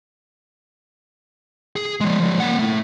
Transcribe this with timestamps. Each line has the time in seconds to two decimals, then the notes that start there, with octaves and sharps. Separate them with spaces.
1.76 G#4
2.01 F3 G#3
2.19 F3 G#3
2.40 A#3 F#5
2.59 A3 E4